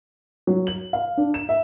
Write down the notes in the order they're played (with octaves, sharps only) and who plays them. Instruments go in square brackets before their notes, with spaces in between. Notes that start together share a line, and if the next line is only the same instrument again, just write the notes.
[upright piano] F#3
F#7
F5
D4
E7
E5